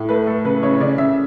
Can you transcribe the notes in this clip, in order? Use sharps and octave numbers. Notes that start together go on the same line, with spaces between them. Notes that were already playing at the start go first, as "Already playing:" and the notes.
Already playing: A2
A3 B4
A3 A4
C#3 B4
C#3 C#5
C#3 D5
C#3 E5